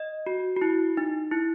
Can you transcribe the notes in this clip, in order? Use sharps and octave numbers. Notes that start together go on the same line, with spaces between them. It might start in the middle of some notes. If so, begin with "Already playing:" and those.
Already playing: D#5
F#4
F#4
E4
D#4
E4